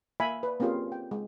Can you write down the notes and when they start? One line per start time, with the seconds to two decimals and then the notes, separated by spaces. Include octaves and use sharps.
0.20 A#3 E5 F5 G#5 B5
0.43 B4 D5
0.60 A#3 C4 C#4 F4 G4 G#4
0.92 G5
1.11 G#3